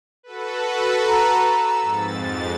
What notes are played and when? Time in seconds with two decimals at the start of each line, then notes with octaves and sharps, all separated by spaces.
0.23 F#4 A4 B4
1.08 A#5
1.47 E6
1.80 F2 G#2 A6